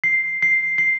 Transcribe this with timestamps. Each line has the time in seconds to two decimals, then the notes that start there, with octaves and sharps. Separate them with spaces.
0.04 C7
0.42 C7
0.78 C7